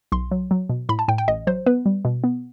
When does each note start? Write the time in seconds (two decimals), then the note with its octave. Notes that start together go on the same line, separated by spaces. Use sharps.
0.12 B1 C6
0.31 F#3
0.51 F#3
0.70 B2
0.89 A2 B5
0.99 A5
1.08 A2 G5
1.18 G5
1.28 A1 D#5
1.47 F#3 C5
1.66 B3 B4
1.86 G3
2.05 B2
2.24 B3